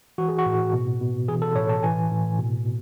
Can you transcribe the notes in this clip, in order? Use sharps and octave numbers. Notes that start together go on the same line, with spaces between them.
E3 F#4
G#4
F#4
A2
B2
B2
E3 G#4
A4
A2 C#5
A5
E3 G#5
A2
B2
B2